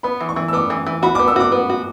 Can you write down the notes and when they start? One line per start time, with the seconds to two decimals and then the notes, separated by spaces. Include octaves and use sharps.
0.03 B3 B5
0.21 E3
0.29 C#6
0.36 E3
0.48 E6
0.53 B3 D6
0.70 E3
0.86 E3
1.03 F#4 B5
1.15 D6
1.19 B3
1.28 E6
1.36 F#4 D6
1.52 B3
1.70 F#4